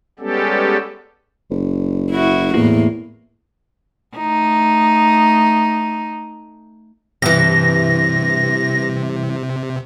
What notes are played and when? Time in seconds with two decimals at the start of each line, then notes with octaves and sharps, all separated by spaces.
0.19 G3 G#3 B3 C#4 G4 A4
1.51 F#1
2.11 E4 F#4
2.54 E2 A2 A#3
4.17 A3 D#4
7.22 G2 C3 E3 A#6